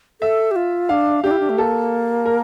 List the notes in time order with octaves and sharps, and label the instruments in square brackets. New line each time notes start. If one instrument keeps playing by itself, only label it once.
[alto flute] A4 [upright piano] E5
[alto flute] G4
F4
[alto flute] D4 [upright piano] F5
[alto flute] D4 [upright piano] G4
[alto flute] E4
D4
A3
[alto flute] A#3 [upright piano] A4
[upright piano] A#4